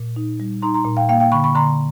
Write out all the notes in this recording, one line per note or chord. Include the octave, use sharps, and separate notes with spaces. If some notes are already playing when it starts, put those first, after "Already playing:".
Already playing: A#2
D#4
G3
D#4 A#5 C6
A#5 C6
A#2
F5 G5
A#3 F5 G5
F5 G5
D3 B5 C#6
B5 C#6
D3 A#5 C6